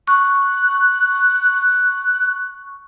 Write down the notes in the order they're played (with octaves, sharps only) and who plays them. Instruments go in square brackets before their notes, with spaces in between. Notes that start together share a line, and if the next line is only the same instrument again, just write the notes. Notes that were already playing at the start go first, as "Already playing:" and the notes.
[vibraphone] C#6 [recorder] F#6